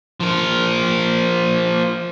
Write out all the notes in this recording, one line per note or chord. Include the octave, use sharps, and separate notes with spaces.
F3 A#4